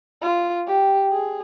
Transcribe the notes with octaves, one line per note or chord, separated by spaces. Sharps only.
F4
G4
G#4